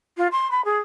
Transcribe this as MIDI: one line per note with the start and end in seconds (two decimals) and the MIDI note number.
0.17 0.28 65
0.32 0.50 84
0.51 0.62 83
0.65 0.79 68